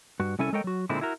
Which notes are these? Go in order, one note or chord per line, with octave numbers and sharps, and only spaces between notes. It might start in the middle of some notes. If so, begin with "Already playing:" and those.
G2 F#4
C2 C#4 E4 A4 G#5
G#3 A4 A#4 C#5 D#5 G5
F#3 F#4
A#2 D3 G#3 C4 E4
E4 F#4 A#4